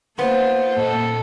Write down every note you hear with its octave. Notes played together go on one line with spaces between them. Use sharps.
A#3 B3 C5 F5 C6
A#2 A#3 A4 D#5